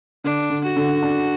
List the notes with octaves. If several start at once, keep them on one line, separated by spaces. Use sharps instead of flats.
D3 D4
D3
F#4
D3
D4